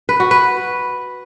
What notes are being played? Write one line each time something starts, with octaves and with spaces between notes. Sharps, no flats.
B4
F#4
B4